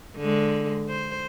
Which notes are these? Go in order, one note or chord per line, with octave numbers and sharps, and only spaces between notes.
D3 G#3
C5